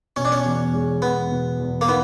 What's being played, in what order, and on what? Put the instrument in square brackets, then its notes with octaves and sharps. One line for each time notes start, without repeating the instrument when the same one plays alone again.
[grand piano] B2 [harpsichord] C#4
[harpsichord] D4
C#4
[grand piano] E2
G#3
[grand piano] E2 [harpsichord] B3
[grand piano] B2
E2
[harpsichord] A#3
[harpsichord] B3 [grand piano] D#4